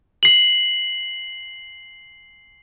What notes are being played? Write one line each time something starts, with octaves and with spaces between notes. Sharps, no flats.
C7 F#7